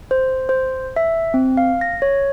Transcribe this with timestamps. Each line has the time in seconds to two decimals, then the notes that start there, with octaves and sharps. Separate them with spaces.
0.11 C5
0.49 C5
0.96 E5
1.34 C4
1.57 F5
1.81 A#6
2.02 C#5